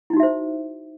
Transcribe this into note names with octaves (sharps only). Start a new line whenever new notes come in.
D#4 E4 F#4 C5 E5